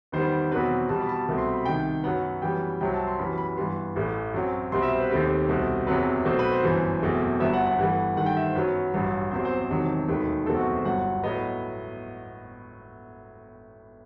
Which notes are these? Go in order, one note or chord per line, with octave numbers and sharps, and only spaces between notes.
E2 D#3 G3 B3 C5
E2 B2 F#3 C4 B4
E2 B2 G3 A5
B5
A5
C2 B2 A3 C4
C6
B5
B5
C2 C3 D#3 G5
F#2 F#3 B3 F#5
F#2 E3 G3 B3 G5
C2 C3 F#3 C4 G5
A5
C6
F#2 E3 G3 B3 B5
B5
G2 E3 B3 C6
A1 A2 E3 A3
F#2 F#3 C4
C2 B2 G3 C4 C6
E5
C5
B4
D#2 D#3 A3 C4 G4
C2 B2 A3 C4
F#1 E2 C3 F#3 C4 B4
B1 B2 A3 C4 C5
B4
C5
G1 F#2 E3
F#1 E2 B2 A3 C4
G1 G2 F#3 B3 E5
F#5
F#5
G2 E3 A3
G2 D#3 A3 F#5
G5
E5
C5
F#2 F#3 B3 B4
A1 G2 F#3
E2 C3 F#3 C4 C5
C5
C5
E1 E2 C3 D#3 F#3
E1 D#2 D#3 A3 B4
F#1 E2 B2 A3 C4 A4
F#4
B4
C5
G1 G2 F#3 F#5
A2 F#3 B3 D#5